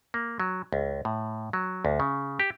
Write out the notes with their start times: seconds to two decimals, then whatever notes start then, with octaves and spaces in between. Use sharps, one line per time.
0.14 A#3
0.40 F#3
0.73 C#2
1.05 A2
1.53 F#3
1.85 D2
2.00 C#3
2.40 G4